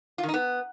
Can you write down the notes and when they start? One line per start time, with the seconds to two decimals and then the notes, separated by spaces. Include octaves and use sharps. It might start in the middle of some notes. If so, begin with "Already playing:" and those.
0.18 F4
0.23 D#3
0.28 D#4
0.34 B3